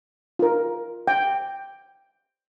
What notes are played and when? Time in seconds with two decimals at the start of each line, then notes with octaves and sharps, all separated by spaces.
0.39 F4 A#4
1.08 G5